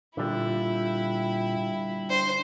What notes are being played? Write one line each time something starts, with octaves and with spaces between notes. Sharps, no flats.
A#2 D3 G3 E4 F4
D4 C5